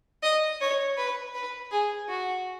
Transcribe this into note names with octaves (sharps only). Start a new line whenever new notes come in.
D#5
C#5
B4
B4
G#4
F#4